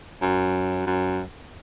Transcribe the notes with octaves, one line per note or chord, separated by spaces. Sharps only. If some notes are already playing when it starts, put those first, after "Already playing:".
F#2
F#2